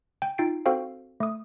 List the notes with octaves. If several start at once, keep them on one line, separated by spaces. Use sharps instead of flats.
G5
D#4 F4 G5 A6 C7 D7
C4 F#4 A4 C5 F5 G5
A3 D#6